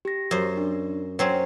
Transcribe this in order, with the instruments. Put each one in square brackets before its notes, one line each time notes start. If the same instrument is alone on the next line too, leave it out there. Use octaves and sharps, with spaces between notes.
[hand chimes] G4 A#6
[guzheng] F#2 C5
[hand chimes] D4
[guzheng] F#3 C4 C#4 [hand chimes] C5 C7